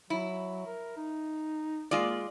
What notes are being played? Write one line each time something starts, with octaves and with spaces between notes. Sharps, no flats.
F#3 E4
A#4
D#4
G#3 A#3 F4 D5